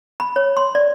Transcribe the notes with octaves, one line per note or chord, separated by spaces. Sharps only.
B5
C#5
C6
D5